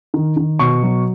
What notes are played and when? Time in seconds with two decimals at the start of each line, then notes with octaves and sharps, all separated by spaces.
0.14 D#3
0.37 D#3
0.59 B2 C#6
0.83 F#3